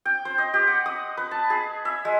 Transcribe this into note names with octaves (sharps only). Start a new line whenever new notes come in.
G5
C5
D#5
G4
F#5
D#6
B4
A5
G#4
E5
G#3